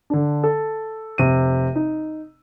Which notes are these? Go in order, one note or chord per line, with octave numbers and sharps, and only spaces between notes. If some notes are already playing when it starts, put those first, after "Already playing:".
D3 D4
A4
F1 C3 D#7
D#4